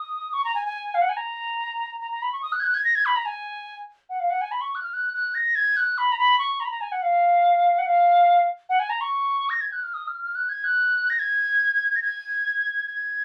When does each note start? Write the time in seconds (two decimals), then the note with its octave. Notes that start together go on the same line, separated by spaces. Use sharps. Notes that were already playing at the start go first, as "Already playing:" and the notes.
Already playing: D#6
0.33 C#6
0.45 A#5
0.55 G#5
0.65 G#5
0.94 F5
1.02 F#5
1.09 G#5
1.17 A#5
2.00 A#5
2.11 A#5
2.22 B5
2.33 C#6
2.42 D#6
2.52 F#6
2.60 G#6
2.64 F#6
2.74 G#6
2.84 A#6
2.95 G#6
3.06 B5
3.16 A#5
3.26 G#5
4.10 F#5
4.20 F5
4.30 F#5
4.41 G#5
4.51 B5
4.61 C#6
4.75 F#6
4.83 F6
4.94 F#6
5.13 F#6
5.34 A#6
5.55 G#6
5.77 F#6
5.98 B5
6.12 A#5
6.18 B5
6.39 C#6
6.60 A#5
6.65 B5
6.71 A#5
6.81 G#5
6.92 F#5
7.02 F5
7.78 F#5
7.86 F5
8.69 F#5
8.79 G#5
8.90 A#5
9.01 C#6
9.50 A#6
9.61 G#6
9.73 F#6
9.83 F6
9.94 D#6
10.07 F6
10.22 F6
10.35 F#6
10.49 G#6
10.64 F#6
11.10 A#6
11.19 G#6
11.96 A#6
12.02 G#6
12.87 G#6